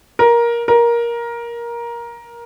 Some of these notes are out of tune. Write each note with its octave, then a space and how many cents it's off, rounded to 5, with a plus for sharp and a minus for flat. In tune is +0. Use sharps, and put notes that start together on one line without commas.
A#4 +15
A#4 +15